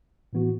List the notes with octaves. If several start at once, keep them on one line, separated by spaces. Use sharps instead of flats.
A2 E3 B3 F#4